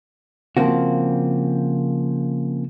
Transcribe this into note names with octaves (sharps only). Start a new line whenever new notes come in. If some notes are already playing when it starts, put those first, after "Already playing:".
C#3 F3 A#3 C4 F#4